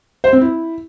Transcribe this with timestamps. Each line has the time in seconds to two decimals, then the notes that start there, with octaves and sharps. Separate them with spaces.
0.24 C5
0.33 C4
0.41 E4